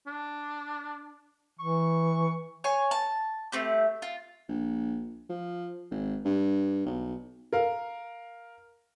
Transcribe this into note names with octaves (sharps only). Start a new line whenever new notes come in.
D4
E3 C#6
C#5 G#5 C6
A5
A3 C4 G4
F4
A#1
F3
G#1
G2
B1
A#4 F5